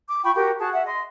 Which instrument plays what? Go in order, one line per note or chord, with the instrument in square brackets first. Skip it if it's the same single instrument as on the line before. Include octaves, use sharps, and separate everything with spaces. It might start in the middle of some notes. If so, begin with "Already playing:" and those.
[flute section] D6
F4 G5 B5 C#6
F#4 G4 A#4 G5
F#4 G#4 A5
E5 F#5
D#5 C6